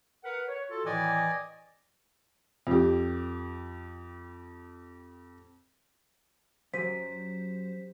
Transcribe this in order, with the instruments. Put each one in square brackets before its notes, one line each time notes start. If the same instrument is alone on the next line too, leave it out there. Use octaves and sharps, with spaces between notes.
[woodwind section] A#4 B4 F#5
C#5
F4 F#4 A4
[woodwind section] A2 D#3 E3 [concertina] D5 D#5 G#5
[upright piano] F2 G4
[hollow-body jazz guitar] F#2 [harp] F#3 G4 D#7 [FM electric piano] C5 [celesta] B6